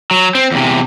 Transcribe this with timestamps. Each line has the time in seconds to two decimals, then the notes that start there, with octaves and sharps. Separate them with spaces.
0.11 F#3
0.35 C4
0.52 E2 C3